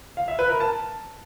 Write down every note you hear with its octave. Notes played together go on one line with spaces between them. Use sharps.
F5
E5
B4
A#4
A5